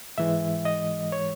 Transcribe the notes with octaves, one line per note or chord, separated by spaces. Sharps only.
G#2 E3 G#3 E5
D#5
C#5